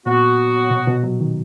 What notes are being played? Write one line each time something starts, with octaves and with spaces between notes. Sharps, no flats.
A#2 F#3 B3 F#4
B2
B2
F#3
D#3